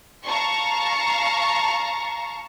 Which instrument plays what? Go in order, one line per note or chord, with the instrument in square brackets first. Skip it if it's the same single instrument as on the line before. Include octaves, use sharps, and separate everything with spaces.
[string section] F5 A5 A#5 C#6